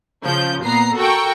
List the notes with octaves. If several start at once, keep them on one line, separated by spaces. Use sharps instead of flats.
C#3 F3 G6
A#2 B3 A#5 C7
F#4 A4 A#4 G5 C#6